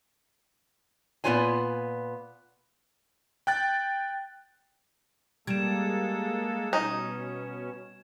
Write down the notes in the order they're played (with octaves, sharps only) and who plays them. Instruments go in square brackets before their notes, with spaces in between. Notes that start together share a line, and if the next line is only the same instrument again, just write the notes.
[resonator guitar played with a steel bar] A#2 B3 C4 F4 C#5 G#5
[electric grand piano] G5 F#6 A6
[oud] G3 [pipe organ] G#3 A#3 A4 [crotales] G#6 E7
[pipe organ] B2 C#4 [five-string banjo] D#4